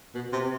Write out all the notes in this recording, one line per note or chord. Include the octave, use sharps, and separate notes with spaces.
B2
C3